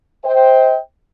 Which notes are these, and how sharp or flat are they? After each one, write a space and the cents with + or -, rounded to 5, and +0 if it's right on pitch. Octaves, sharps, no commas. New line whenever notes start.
C5 +0 D#5 +45 G5 +0